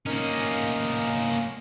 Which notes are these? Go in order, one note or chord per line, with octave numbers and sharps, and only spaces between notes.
A#3 C#4 D#4 A#4